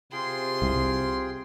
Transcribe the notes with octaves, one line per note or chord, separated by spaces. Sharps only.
C3 F4 G#4 G5 C6
C2